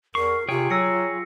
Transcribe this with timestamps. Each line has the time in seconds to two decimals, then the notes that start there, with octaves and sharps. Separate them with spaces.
0.15 E2 A#4 C#6 C7
0.49 C3 F4 G#4 C#5 G5
0.70 F#3 E6 A#6 C#7